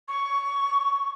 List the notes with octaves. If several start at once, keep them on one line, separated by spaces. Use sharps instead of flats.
C#6